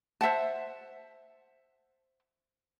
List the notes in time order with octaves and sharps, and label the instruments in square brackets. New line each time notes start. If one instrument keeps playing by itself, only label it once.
[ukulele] C5 E5 F#5 A5